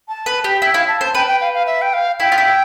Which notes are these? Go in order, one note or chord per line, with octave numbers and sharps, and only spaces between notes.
A5
B4
G4
E4 G5
E4 F5
A5
C5 A5
B4 G5
G5
F5
F5
E5
G5
F5
E4 G5
F4
E4